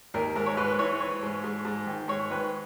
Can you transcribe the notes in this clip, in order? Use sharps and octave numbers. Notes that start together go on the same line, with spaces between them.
D#2 A#4
G#2 A#4
C#5
G#2 B4
B4
E3 C#5
E3 C#5
G#2
G#2
G#2
D#3
G#2 C#5
D#3 B4